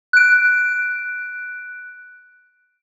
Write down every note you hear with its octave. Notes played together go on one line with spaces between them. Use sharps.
F#6 D7